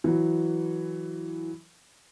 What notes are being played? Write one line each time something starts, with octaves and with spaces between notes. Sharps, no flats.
E3 F#3